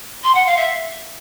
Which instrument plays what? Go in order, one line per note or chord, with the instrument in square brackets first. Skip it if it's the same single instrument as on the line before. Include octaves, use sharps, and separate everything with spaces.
[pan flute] C6
F#5
F5
E5